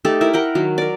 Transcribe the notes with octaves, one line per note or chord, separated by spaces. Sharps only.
A3 D#4 G4 A4
E4 A#4 E5
A#4 F#5 G5
D#3 F#3
A#4 D5